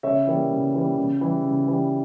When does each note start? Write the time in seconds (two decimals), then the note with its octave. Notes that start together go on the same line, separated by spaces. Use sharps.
0.03 C#3 C#5 E5
0.27 E3 G3 A#3
0.51 C#3
0.74 E3 G3 A#3
0.97 C#3
1.21 E3 G3
1.44 C#3
1.68 E3 G3